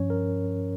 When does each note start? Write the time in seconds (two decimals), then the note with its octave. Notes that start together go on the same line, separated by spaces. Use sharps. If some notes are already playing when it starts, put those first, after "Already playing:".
Already playing: G2 F3 C#4 C#5
0.10 A#4